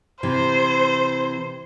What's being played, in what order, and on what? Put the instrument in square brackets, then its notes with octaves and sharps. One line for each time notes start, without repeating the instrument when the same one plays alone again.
[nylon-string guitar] C3 E3 [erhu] C5